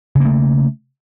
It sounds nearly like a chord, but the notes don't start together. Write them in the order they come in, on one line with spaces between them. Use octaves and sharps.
C#3 A#3 A3